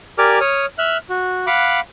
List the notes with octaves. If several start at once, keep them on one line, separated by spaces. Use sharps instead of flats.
G4 A#4 D5 G#5 D6 F6
C#5 D#6 F6
E5 F6 F#6
F#4
F5 F#5 B5 D6 F#6